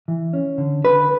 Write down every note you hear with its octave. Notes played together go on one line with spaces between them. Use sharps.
E3
C#4
D3
D3 B4